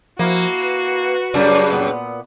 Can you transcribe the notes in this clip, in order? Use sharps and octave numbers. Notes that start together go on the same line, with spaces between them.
F3 A#3 E4 F#4
B4
F#2 C#3 G3 A#3 D4
A#2 B3